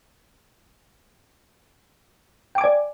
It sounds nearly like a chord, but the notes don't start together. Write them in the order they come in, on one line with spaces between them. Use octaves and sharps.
G5 D6 G#5 D5